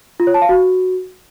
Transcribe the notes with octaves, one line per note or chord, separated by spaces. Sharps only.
F4
C#5
A5
F5
F#4